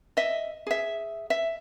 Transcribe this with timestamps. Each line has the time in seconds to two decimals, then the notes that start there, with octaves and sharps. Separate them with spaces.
0.17 D#5 E5
0.67 G#4 E5
1.30 E5